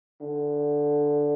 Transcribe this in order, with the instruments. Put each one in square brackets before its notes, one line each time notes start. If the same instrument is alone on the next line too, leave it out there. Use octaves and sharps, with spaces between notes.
[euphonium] D3